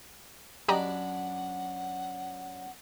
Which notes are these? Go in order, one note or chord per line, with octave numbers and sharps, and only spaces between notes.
F#2 D4 G4 B4 D#5 F#5 A#5